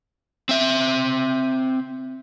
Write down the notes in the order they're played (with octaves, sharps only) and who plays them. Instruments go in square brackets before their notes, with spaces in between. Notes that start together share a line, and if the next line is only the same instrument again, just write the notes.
[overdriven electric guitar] C4 E5